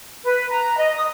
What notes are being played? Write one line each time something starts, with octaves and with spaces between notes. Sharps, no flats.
B4
A#5
D#5
D#6